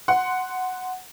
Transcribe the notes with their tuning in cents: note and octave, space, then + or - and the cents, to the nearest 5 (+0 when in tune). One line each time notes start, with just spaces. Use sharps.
F#5 +0 C6 -10